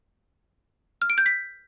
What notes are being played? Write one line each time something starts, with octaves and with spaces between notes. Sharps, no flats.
F6
D7
G6
B6